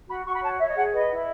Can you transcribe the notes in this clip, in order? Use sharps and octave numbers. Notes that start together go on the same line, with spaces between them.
F#4 B5
F#4 C#6
B5
C#5 A5
C#5 E5
D#5
G#4 F#5
B4 D#5
E4